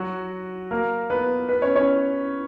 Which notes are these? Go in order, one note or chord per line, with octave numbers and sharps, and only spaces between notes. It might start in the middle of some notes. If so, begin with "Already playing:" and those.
Already playing: F#3 F#4
A#3 A#4
B3 B4
B3 B4
C#4 C#5
C#4 C#5